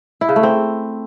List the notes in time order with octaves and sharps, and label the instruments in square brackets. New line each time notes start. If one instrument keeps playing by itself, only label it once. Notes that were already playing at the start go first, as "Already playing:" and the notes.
[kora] E4
C#3
A3
C4